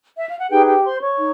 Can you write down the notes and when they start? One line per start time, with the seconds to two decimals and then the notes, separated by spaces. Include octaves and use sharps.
0.17 E5
0.28 F5
0.39 F#5
0.49 D#4 G4 G#4 B4 G5
0.67 G4 G5
0.84 C5 C6
1.00 C#5 C#6
1.17 D#4